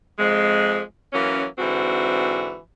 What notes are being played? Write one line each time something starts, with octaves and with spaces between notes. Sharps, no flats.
F2 G#3
E3 F#3 A#3 C#4
G#2 D3 E3 C4 F#4